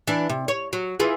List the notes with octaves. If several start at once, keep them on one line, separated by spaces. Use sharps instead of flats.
E3 D4
C3
C#5
F#3
E3 F4 G#4